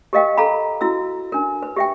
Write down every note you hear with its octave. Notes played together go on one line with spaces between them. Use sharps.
G4 A#4 D#5 F5 G5
A4 F5 A#5 B5
E4 F#4 E6
D4 A#4
B4
G4 E5 G5